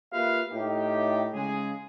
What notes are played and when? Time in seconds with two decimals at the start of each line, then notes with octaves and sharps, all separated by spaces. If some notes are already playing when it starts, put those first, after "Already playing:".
0.12 A#3 F4 G4 B4 E5 F5
0.52 A2 D#4 G4
1.33 C#3 G#3 G#4